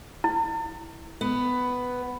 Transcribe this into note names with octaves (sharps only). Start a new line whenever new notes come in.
E4
B3